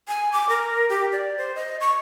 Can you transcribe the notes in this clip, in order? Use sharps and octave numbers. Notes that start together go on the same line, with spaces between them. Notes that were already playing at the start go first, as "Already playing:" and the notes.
G#5
D6
A#4
G4
D5
C5
D#5
C#6